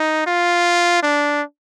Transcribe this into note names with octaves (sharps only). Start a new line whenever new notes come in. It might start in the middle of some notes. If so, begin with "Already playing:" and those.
Already playing: D#4
F4
D4